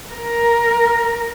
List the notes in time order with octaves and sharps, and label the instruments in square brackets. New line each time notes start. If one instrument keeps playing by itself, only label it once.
[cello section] A#4